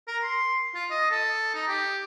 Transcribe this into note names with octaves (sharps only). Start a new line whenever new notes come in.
A#4
C6
F4
D#5
A4
D#4
G4